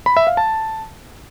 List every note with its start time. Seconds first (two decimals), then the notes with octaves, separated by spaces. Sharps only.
0.06 B5
0.17 E5
0.27 F5
0.37 A5